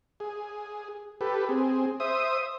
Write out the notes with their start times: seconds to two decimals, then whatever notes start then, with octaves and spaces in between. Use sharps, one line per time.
0.20 G#4
1.21 G4 A4 B4
1.49 C4 G#4
2.00 C5 E5 D#6